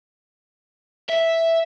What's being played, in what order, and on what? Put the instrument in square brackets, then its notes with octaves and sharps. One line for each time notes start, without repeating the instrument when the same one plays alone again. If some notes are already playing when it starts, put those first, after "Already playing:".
[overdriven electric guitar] E5